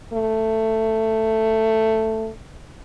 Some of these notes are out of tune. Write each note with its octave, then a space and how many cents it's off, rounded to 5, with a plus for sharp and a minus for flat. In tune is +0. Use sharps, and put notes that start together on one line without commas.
A3 +10